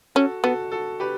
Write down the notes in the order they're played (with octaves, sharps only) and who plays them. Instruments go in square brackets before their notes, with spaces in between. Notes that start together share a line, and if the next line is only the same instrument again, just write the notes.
[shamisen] C#4 [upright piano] F#4 A4
[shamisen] B3 [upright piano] F#4 A4
[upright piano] F#4 A4
G4 B4